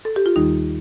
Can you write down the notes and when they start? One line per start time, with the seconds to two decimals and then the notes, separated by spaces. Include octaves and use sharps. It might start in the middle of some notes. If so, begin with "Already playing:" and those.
0.05 A4
0.16 G4
0.26 F4
0.36 D#2 D#3 G3 D#4